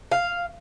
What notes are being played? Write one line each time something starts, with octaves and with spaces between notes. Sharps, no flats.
F5